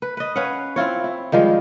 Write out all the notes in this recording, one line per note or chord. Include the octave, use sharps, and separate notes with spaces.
B4
B4 D#5
C#4 B4 F5 F#5
C4 E4 F4 C#5
E4
D#3 F3 G3 G#3